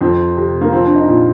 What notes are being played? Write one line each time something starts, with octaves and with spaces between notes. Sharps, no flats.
F2 C4
C3
A#3
F3 C4
D4
D#4
A#2